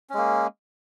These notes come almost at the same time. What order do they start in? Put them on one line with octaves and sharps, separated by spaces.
C#4 G#3 A#3